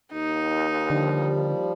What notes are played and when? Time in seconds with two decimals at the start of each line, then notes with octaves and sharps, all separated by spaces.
0.13 D#2 D#4
0.90 D3 F3 G3